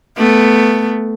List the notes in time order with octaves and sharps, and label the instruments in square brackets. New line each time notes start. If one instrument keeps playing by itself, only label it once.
[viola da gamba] A3 B3